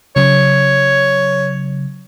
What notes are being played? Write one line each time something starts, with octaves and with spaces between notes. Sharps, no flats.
C#3 F#3 C#5